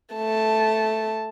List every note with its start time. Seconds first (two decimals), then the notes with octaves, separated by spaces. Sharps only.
0.15 A3 A5